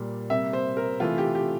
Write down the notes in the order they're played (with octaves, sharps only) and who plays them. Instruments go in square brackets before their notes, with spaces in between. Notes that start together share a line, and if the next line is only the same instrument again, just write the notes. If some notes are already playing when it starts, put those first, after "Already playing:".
Already playing: [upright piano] A#2 G3 A#3
C3 G3 A#3 E5
C5
A#4
C3 E3 A3 F4
G4
G4